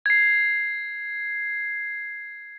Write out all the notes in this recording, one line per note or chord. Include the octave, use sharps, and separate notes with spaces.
G#6 C7